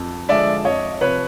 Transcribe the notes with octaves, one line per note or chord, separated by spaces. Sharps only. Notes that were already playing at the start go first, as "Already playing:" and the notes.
Already playing: F2
D3 F3 G#3 D5 E5
F2 C#5 D#5
C3 F3 B4 C#5